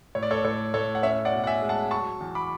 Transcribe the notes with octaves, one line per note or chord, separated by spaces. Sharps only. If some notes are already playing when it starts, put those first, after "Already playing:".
A2 C#5
D5
A4 C#5
A2 A4 C#5
A2 A4 C#5
F#5
C#4 C#5 E5
D5 F#5
B2
F#5
E5 G#5
G#3
F#5 A5
F#3 A5 C#6
E2
B5 D6